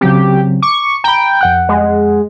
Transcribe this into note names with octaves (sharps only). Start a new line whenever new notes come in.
C#3 F#3 C4 G4
C#6 D6
G5 A#5 B5
F2 F#5 F#6
G#3